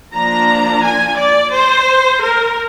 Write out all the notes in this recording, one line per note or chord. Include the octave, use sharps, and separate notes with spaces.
F3 A#3 D4 A#5
G#5
D5
C5
A#4